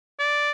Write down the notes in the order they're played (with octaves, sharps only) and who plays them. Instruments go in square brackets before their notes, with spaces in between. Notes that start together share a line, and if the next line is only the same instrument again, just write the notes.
[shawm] D5